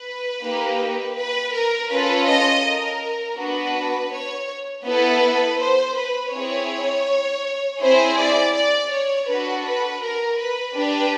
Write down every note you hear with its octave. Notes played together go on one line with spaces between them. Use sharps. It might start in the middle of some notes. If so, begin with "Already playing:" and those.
Already playing: B4
A#3 D#4 G4
B4
A#4
C#4 F4 A4 B4
D#5
A#4
B3 D4 F#4 B4
C#5
B3 E4 A4 B4
C5
B4
C4 E4 G#4 C#5
C4 E4 G#4 C5
D5
D5
C#5
D4 F#4 A4 B4
B4
A#4
B4
D4 G4 B4